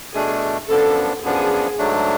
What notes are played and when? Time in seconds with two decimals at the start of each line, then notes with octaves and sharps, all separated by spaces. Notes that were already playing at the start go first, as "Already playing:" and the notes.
0.13 B2 A3 D4 G#4
0.69 F#2 F3 B3 D4 A4
1.23 F#2 F3 B3 D4 G#4
1.79 G#2 F#3 A3 D4